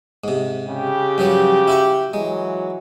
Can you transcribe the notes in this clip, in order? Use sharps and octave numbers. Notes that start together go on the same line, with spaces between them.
G#2 C3
C#3 G4
G2 F3 F#3
E4 F#4 C#6
E3 F#3 G#3